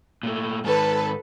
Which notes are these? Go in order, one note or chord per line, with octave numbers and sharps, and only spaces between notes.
A#2 A3
G#2 D#3 A4 B4